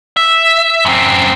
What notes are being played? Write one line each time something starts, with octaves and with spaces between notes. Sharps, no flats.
E5
F#2 C4